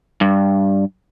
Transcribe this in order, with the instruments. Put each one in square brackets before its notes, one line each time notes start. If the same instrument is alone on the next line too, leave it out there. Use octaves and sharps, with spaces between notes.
[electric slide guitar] G2